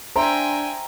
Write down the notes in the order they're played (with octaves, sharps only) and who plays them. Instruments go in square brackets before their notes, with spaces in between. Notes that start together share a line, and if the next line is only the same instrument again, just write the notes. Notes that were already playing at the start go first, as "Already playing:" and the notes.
[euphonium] D4 [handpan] C5 E5 [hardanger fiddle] G5 G#5 [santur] A#5